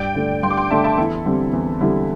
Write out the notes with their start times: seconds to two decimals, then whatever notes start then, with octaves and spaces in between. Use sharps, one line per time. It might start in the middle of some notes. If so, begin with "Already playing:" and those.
Already playing: G2 D5 G5
0.15 D3 A3 D4
0.43 G2 G5 C6
0.50 D6
0.57 G5 C6
0.70 D3 A3 D4 E5 A5
0.84 E5 A5
0.98 E2 E4 A4
1.26 D3 G3 C4
1.53 E2
1.81 D3 G3 C4 E4